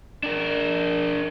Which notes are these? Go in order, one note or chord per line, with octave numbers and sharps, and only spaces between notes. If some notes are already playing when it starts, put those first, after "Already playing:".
D4 A#4